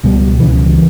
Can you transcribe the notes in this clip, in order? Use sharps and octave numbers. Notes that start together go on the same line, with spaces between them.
C#2 B2 G3
C#2 C#3 E3